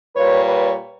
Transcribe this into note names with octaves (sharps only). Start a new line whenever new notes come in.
A#2 G3 B4 C#5
B4 C#5